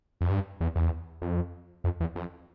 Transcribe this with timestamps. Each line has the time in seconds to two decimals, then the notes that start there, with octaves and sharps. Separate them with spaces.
0.21 F2
0.30 G2
0.61 E2
0.76 E2
1.22 F2
1.84 F2
2.00 E2
2.16 F2